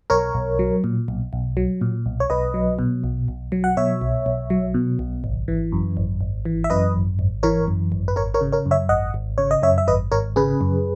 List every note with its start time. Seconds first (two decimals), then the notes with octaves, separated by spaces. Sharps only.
0.10 B1 A#4 C#5
0.34 B1
0.59 F#3
0.84 A#2
1.08 B1
1.33 B1
1.57 F#3
1.81 A#2
2.06 B1
2.20 C#5
2.30 B1 B4 D#5
2.54 F#3
2.79 B2
3.04 B1
3.28 B1
3.52 F#3
3.64 F#5
3.77 B2 C#5 E5
4.02 B1
4.26 B1
4.50 F#3
4.74 B2
4.99 B1
5.24 G#1
5.48 E3
5.72 F#2
5.97 G#1
6.21 G#1
6.45 E3
6.64 E5
6.70 F#2 B4 D#5
6.94 G#1
7.19 G#1
7.43 E3 A#4 C#5
7.68 F#2
7.92 G#1
8.08 B4
8.16 G#1 A#4 C#5
8.34 A#4 C#5
8.41 C#3
8.52 A#4 C#5
8.66 F#2
8.71 C#5 E5
8.89 G#1 D#5 F#5
9.14 G#1
9.38 C#3 C#5
9.51 D#5
9.62 F#2 C#5 E5
9.78 E5
9.88 G#1 B4 D#5
10.12 G#1 A#4 C#5
10.36 C#3 G#4 B4
10.61 F#2